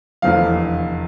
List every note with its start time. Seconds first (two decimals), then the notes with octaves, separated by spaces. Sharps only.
0.22 F1 E2 D3 F3 F5